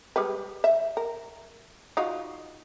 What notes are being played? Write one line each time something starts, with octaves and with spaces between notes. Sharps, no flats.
G3 G#3 B4
E5
A#4
D#4 F4 F#4